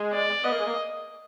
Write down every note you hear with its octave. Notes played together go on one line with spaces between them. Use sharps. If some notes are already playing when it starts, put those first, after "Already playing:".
Already playing: G#3
D5
B3 D#5
A#3
G#3
A#3